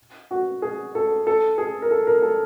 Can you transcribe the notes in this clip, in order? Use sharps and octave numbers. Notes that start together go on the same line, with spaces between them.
F#4
G#4
A4
A4
G#4
A#4
A4
A#4
A4